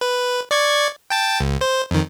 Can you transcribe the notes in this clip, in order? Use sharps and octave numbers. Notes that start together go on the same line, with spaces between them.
B4
D5 C#6 G#6
G5 A5 A6
C#2
C5
F2 D#3